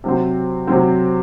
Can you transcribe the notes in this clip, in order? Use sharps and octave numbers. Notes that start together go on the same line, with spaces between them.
C3 F#3 C4
C3 F#3 C4